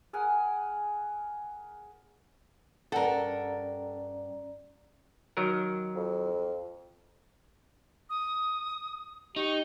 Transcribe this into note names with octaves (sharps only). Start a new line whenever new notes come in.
G#4 A#4 F#5 G#5
G2 C#4 A4 A#4 D5 F#5 A#5
D#3 F#3 A#4
F2
D#6
D#4 G4 C#6